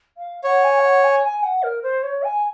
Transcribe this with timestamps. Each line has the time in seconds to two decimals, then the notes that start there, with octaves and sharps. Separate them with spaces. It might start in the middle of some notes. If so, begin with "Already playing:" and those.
0.17 F5
0.44 C#5 F#5
0.63 G#5
0.78 F5
0.83 F#5
1.03 G#5
1.23 G#5
1.43 F#5
1.62 A#4
1.82 C5
2.03 C#5
2.23 G#5